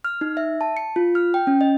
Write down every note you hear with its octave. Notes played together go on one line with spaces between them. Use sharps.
F6
D#4
E5
A5
C#7
F4
F6
G5
C#4
D#5